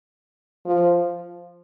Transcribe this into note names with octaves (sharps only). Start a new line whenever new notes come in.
F3